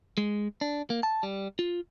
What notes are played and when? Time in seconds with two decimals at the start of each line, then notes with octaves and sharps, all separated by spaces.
0.18 G#3
0.61 D4
0.90 A#3
1.03 A5
1.23 G3
1.59 F4